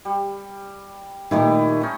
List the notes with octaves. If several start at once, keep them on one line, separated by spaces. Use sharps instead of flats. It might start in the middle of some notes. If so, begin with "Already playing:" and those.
G3
A#2 D#3 G3 A3 D#4 E4
C#4 D#4